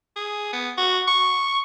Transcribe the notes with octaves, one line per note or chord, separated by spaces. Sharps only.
G#4
B3
F#4
C#6